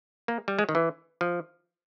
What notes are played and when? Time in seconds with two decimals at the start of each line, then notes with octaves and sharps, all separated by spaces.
0.28 A#3
0.48 G3
0.59 G#3
0.69 D#3
0.75 E3
1.21 F3